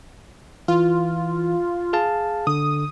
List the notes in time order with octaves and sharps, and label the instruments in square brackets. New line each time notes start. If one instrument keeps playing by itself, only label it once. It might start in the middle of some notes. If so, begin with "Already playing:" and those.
[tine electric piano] E3 [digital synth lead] F4
[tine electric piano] G#4 F5 A5
[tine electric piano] D3 [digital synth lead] D#6